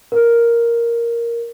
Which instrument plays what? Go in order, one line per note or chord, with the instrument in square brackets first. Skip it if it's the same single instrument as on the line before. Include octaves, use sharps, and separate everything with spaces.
[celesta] A#4